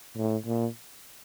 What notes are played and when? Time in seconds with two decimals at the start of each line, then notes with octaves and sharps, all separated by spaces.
0.17 A2
0.47 A#2